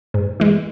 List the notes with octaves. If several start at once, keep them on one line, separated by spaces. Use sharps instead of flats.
G#2
E3 G#3